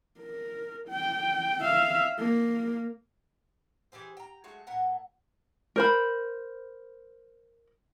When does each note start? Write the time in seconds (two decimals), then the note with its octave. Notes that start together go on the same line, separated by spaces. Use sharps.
0.19 A#4
0.88 G5
1.61 E5 F5
2.19 A#3
3.92 E3 G4 G#4 C5
4.17 G5 A#5
4.44 F#3 G#3 A3 F#4
4.67 A2 B3 A#4 F#5
5.76 A#4 C5 B5